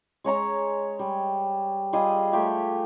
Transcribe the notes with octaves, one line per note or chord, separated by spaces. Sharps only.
G#3 C#5 A#5 C#6
G3
G3 F4 G#4 D#5
A3 F4 G4 E5